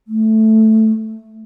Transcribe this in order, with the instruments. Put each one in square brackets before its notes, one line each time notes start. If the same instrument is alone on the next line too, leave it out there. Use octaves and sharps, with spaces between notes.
[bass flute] A3